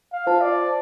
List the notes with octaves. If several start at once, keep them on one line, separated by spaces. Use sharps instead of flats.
F5
F4 C5 A5
D5